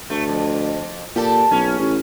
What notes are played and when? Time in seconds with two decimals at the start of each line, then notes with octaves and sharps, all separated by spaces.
0.10 D2 A3
0.28 F2
1.16 A#2 G4 A4
1.51 B1 C#4
1.79 A1